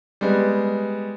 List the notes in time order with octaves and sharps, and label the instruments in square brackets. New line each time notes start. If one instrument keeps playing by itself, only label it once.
[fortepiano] G3 G#3 B3